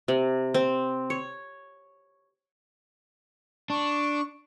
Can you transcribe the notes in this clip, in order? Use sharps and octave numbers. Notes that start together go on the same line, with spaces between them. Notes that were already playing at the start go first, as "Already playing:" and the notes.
C3
C4
C#5
D4 C#6